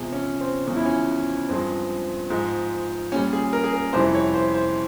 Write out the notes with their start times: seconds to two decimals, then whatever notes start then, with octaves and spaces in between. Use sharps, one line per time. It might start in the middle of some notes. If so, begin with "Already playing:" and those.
Already playing: E2 C3 F3 G#3
0.13 C#4
0.41 C4
0.67 E2 C#3 F3 G#3 C#4
0.76 E4
0.86 C#4
1.49 G2 F3 G#3 C4
2.30 G#2 F3 G#3
3.12 A#2 C#4
3.16 G3
3.33 G#4
3.53 A#4
3.64 G#4
3.73 A#4
3.93 F2 C3 E3 G3 C5
4.14 C#5
4.34 C5
4.54 C5